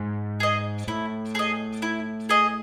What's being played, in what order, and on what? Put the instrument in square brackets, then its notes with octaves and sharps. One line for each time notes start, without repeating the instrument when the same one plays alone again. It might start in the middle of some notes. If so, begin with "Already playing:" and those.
Already playing: [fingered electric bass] G#2
[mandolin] G#4 D#5
[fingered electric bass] A2 [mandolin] E4
[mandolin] G#4 D#5
E4
G#4 D#5